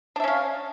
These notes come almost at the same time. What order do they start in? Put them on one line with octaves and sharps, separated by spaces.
D4 E5 C#4 F5